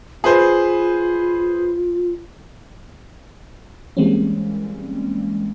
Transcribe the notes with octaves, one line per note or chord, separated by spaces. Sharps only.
F4 G#4 B4 C5
E3 G3 G#3 A#3 C4 C#4